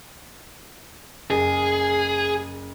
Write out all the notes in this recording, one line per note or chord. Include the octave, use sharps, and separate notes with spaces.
F#1 G#4